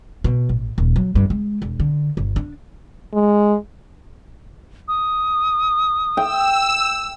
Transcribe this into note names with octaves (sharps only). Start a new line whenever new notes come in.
B2
A1
D#1
F#3
G2
G#3
E1
D3
G1
D4
G#3
D#6
G5 E6